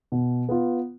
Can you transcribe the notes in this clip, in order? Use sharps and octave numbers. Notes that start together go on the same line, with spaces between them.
B2
B3 F4